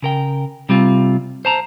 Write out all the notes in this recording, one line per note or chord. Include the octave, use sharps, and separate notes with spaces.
C#3 A#4 G5
C3 G3 C4 F4
C5 A5 A#5